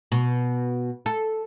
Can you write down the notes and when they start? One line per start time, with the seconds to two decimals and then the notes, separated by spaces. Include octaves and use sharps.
0.12 B2
1.06 A4